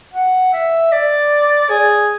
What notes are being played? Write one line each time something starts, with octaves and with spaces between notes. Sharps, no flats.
F#5
E5
D5
G#4